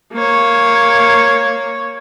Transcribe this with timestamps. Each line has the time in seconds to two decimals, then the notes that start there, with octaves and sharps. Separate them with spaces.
0.14 A#3 C#5